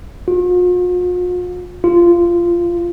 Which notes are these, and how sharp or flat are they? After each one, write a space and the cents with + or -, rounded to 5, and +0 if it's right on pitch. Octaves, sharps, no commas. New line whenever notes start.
F4 +45
F4 -15